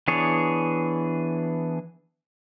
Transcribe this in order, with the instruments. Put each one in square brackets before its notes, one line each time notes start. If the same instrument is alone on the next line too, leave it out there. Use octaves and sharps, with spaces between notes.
[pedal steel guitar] E3 B3 D4 G#4 C#5